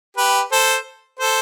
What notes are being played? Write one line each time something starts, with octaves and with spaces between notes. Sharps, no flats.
G4 B4
A4 C5
A4 C5